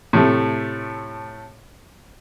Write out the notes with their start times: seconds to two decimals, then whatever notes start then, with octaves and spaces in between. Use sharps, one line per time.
0.13 A2 C3 A3